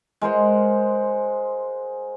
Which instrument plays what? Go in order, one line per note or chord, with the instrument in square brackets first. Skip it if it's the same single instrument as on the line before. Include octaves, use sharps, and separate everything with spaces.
[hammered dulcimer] G#3 A#4 C5 F#5